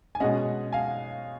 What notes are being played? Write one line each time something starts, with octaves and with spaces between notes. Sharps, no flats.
G#5
B2 G#3 C#4 D#5 F#5
F5 G#5